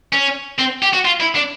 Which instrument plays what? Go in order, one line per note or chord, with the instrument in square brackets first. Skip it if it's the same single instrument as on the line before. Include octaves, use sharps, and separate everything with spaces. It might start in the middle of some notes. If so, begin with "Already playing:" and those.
[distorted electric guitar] C#4
C4
G4
F#4
F4
E4
D4